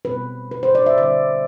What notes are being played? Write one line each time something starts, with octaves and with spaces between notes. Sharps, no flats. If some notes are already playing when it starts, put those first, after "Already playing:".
B2 G3 C4 B4
B4
C5
D5
E5
D3 G3 C4 D5